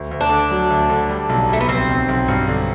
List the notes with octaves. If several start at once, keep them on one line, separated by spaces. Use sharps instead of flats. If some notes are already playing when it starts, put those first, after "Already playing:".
Already playing: D2
D2
D4
D3
F#3
D2
D3
G3
B1
G3 A3
B3
B1 C4
B1
B1
G2
D3